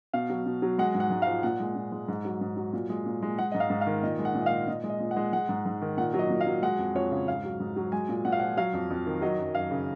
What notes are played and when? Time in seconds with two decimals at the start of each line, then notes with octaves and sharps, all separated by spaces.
0.13 B2 F5
0.30 F#3
0.46 B2
0.62 F#3
0.78 G#3 F#5
0.95 G#2
1.00 F#5
1.11 G#2
1.22 F5
1.27 F3
1.43 A#2 F#5
1.60 G#3
1.76 A#2
1.92 G#3
2.08 G#2
2.25 F#3
2.41 G#2
2.57 F#3
2.73 A#2
2.90 G#3
3.06 A#2
3.22 G#3
3.39 G#3 F#5
3.52 G#2 D#5
3.60 F5
3.70 G#2
3.81 F5
3.87 D#3
4.03 A#2 D#5
4.19 G#3
4.25 F#5
4.35 A#2
4.41 D#5
4.46 F5
4.51 G#3
4.68 A#2 D#5
4.84 G#3
4.89 D#5
5.00 A#2
5.11 F#5
5.16 G#3
5.33 G#3 F#5
5.49 G#2
5.66 G#2
5.82 D#3
5.97 A#2 F#5
6.14 F#3
6.19 D#5
6.30 A#2
6.41 F5
6.46 F#3
6.63 G#3 F#5
6.79 F2
6.95 F2 C#5
7.11 C#3
7.28 G#2 F5
7.44 F#3
7.60 G#2
7.76 F#3
7.92 G#3 G#5
8.09 A#2
8.25 A#2 F#5
8.32 F5
8.40 F3 F#5
8.57 F#3 F5
8.74 F2
8.90 F2
9.06 D#3
9.22 F#3 D#5
9.38 F#2
9.54 F#2 F5
9.71 C#3